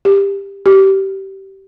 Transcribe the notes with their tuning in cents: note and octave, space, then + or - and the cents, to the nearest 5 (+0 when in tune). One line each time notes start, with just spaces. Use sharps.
G4 +15
G4 -20